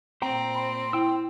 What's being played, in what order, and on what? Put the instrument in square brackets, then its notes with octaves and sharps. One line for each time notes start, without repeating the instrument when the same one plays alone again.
[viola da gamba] A#2 C4 [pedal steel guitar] C5 G5 A#5
[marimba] B5 [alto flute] C6
[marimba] E4 [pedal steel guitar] G5 E6